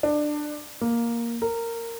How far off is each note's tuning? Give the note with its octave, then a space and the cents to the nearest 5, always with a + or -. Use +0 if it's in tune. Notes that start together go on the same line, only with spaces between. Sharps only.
D4 +20
A#3 +5
A#4 -15